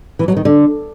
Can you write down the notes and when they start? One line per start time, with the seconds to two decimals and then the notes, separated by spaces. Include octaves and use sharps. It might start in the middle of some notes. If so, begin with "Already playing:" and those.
0.19 E3
0.28 F#3
0.37 D#3
0.45 D3